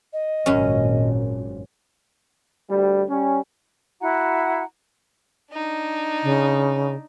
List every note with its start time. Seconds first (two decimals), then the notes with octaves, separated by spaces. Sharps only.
0.13 D#5
0.46 G#1 F#2 A#2 C#4
2.70 D2 G3
3.10 G3 C#4
4.01 E4 F#4 F#5 A#5
5.53 D4 D#4
6.23 C#3